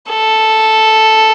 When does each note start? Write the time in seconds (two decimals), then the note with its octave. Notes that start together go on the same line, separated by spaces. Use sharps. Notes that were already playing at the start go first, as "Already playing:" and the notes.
0.10 A4